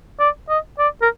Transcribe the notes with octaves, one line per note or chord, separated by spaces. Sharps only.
D5
D#5
D5
A#4